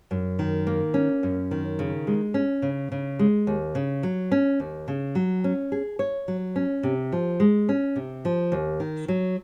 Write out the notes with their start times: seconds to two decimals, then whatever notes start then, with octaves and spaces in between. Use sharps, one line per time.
0.11 F#2
0.39 D#3
0.67 A#3
0.94 C#4
1.23 F#2
1.51 D#3
1.79 C#3
2.07 G#3
2.34 C#4
2.62 C#3
2.92 C#3
3.19 G#3
3.47 D#2
3.75 C#3
4.03 F#3
4.32 C#4
4.60 D#2
4.88 C#3
5.15 F#3
5.44 C#4
5.72 G#4
5.99 C#5
6.28 F#3
6.56 C#4
6.83 C3
7.12 F3
7.40 G#3
7.69 C#4
7.96 C3
8.25 F3
8.52 D#2
8.80 D#3
9.08 F#3